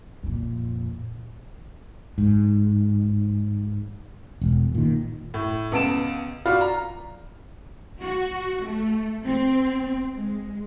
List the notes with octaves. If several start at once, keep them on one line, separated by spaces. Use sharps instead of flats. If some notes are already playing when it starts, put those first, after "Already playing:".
F2 A#2
G#2
E1
A#2 D#3
A2
C#2 B3 A5 D7 E7
F4 F#4 D5 F5 B5 F6
A#5
F#4
A3
C4
G#3